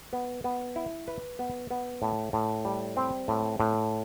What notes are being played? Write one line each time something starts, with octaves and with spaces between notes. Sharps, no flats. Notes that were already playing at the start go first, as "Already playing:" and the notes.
B3
B3
E4
B4
B3
B3
A2
A2
G3
C4
A2
A2